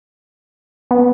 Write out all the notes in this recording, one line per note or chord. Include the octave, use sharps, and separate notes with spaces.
B3